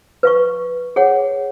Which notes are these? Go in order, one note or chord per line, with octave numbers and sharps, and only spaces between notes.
B4 F5 C#6
G#4 C#5 F#5